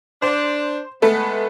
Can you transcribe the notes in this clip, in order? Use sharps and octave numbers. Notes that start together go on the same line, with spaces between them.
D4 C5
G#3 A3 B3 A4 B4